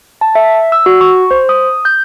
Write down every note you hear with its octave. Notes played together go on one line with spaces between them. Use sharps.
A5
E5
E6
F#4
C#6
C5
D#6
G6